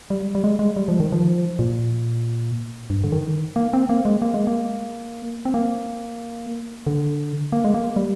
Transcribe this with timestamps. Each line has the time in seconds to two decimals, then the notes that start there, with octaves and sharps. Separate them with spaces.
0.10 G3
0.35 G3
0.44 G#3
0.59 G#3
0.76 G3
0.88 F3
1.00 D#3
1.12 F3
1.59 A#2
2.90 G2
3.04 D3
3.12 D#3
3.56 A#3
3.73 C4
3.89 A#3
4.05 G#3
4.22 A#3
4.34 G#3
4.47 A#3
5.45 C4
5.54 A#3
6.87 D3
7.52 A#3
7.64 G#3
7.74 A#3
7.96 G3